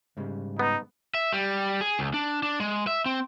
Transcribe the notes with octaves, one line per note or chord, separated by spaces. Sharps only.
G#2 C#3 G3
B3 D#4
E5
G3
G#4
C#2
D4
D4
G#3
E5
C4